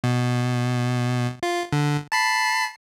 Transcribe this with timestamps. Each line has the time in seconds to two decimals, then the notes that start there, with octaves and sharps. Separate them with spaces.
0.04 B2
1.43 F4
1.73 D3
2.12 A5 B5 C7